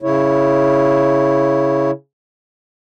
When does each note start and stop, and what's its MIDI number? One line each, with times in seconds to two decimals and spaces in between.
0.02 1.91 49
0.02 1.91 64
0.02 1.91 73